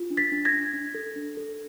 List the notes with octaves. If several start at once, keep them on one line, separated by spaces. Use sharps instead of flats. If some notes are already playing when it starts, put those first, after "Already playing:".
Already playing: F4
D4
A6 B6
D4
G#6 A#6
D4
D4
A4
D4
A4